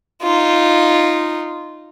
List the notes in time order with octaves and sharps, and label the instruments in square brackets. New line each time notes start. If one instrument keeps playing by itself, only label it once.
[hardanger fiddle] D#4 F4